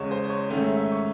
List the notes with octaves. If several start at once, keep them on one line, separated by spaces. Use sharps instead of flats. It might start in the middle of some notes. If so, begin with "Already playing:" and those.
Already playing: E2 C#3 G#3 C#5 D#5
C5
C#5
G#2 D#3 A3 C#4 C#5
E5
E5
C#6